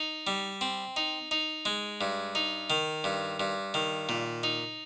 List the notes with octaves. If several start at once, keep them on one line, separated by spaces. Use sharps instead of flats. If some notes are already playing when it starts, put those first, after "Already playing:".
Already playing: D#4
G3
C4
D#4
D#4
G#3
G2
D#4
D#3
G2
G2
D#3
A#2
D#4